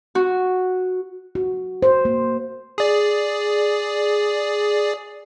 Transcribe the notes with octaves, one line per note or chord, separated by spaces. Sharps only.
F#4
F#4
C5
A#3
G#4 D5